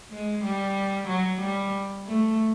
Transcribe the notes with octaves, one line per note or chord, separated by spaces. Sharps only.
G#3
G3
F#3
G3
A3